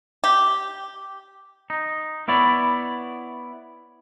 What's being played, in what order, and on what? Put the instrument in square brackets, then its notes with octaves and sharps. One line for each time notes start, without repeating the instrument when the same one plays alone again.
[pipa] G4
[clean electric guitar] D#4
B3 E4 C#5 D5